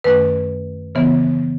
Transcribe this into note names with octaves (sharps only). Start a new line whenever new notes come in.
F#2 D#3 A3 C#4 B4
C#3 E3 B3